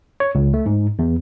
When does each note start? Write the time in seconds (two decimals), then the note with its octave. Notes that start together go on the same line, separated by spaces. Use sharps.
0.20 C#5
0.35 C#2
0.54 A3
0.66 G#2
0.99 E2